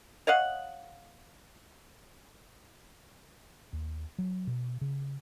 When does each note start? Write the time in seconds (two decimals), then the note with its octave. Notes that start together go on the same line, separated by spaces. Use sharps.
0.27 C#5 D#5 F5 F#5
3.73 D#2
4.18 F#3
4.47 B2
4.81 C#3